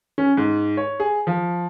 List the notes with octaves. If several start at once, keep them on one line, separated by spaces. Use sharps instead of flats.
C#4
G#2
C#5
G#4
F3